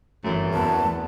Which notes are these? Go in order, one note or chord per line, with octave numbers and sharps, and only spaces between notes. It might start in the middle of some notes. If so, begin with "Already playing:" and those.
G1 F#2 E3 A3
E2 B3 A5